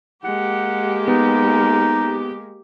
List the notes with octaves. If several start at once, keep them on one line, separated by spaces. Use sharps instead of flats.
G#3 A#3 G4 F#5
B3 D#4